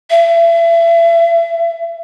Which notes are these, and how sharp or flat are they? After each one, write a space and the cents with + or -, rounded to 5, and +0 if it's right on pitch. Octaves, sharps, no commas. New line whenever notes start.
E5 +35